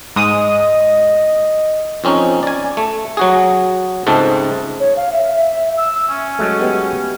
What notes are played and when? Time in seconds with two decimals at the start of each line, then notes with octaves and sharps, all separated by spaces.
0.16 G#2 G#3 D#5 D#6
2.04 F2 C4 C#4 D#4
2.43 D5 G#5
2.77 A3
3.17 F#3 F#4 G#4
4.07 C#2 G#2 A3 C4 A5
4.80 C#5
4.96 F5
5.13 E5
5.37 E5
5.77 E6
6.09 C#4
6.39 F#3 G#3 A3
6.58 B3 G4 D#5